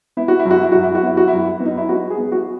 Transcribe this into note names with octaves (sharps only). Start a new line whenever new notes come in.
B3 E4
F#4
E4
F#2
F#4
E4
F#2 F#4
E4
F#4
B3 E4
F#4
F#2 E4
B3
D#4
E4
B3 F#4
G#4
B3
F#4